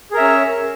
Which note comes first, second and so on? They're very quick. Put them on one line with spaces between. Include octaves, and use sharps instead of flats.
G#4 A#4 E5 C#4 C#5